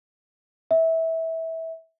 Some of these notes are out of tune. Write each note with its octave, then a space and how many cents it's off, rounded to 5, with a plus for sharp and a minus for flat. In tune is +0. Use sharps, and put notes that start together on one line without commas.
E5 -20